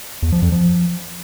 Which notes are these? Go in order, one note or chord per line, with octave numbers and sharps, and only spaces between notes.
E2
F3
F2
F3